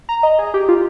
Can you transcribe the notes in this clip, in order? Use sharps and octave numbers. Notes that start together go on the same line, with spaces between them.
A#5
D#5
G#4
G4
F4